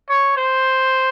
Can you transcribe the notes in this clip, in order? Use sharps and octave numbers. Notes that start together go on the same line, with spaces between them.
C#5
C5